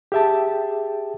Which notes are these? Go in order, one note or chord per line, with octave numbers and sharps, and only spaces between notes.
G4 G#4 E5 G5 A5